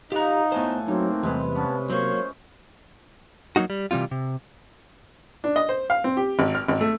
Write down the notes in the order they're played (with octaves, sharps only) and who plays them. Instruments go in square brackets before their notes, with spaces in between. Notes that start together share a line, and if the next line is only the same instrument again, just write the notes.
[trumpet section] D#4 [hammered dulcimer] F4 F#5 [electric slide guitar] G4 A#5
[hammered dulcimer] A2 G#5 A5 [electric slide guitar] B3 C5
[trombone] F#3 [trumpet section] A#3 C4 [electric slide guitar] D#4
[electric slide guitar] E2 G3 [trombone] C3 [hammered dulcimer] G#3 B4
[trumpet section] B3 A5 [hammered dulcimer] C#4
[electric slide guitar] F#3 A#3 [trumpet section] C5 C#5
[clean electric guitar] F#3 A3 A#3 D#4 F#4
G3
C3 E3 G3 C4 F4
C3
[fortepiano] D4
D#5
C5
F5
C4
G4
G#1
F6
G#1
A3